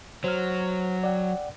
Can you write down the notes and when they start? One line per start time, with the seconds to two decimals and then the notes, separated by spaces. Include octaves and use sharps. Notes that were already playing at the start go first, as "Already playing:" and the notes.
0.24 F#3 C5 F6
1.04 D5 F#5 G5